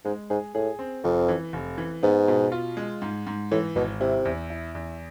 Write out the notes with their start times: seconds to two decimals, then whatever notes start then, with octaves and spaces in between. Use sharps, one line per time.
0.05 G#2 G#3
0.30 G#2 G#4
0.54 A2 G#4
0.79 C4
1.04 F1 F2
1.29 E3
1.53 F1
1.78 E3
2.03 G#2 B3
2.28 B2
2.52 F4
2.77 G#3
3.02 G#2
3.27 G#2
3.51 A2 E3
3.76 G#1 B2
4.01 C3 E4
4.25 E2
4.50 E4
4.75 E2